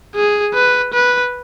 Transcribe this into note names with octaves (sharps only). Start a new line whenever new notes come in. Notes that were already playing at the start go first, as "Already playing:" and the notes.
G#4
B4
B4